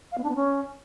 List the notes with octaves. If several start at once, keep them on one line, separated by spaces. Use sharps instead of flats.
F5
B3
D4
B3
C#4